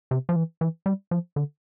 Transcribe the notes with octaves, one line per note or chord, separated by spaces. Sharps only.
C3
F3
E3
E3
G3
F3
D3